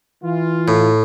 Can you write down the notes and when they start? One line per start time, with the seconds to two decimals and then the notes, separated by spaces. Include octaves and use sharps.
0.24 E3 F4
0.68 A2